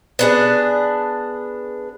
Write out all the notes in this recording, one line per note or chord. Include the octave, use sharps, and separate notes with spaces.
B3 D4 G#4